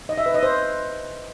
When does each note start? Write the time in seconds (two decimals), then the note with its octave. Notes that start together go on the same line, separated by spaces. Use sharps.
0.09 D#5
0.18 E5
0.26 B4
0.34 D#5
0.43 C5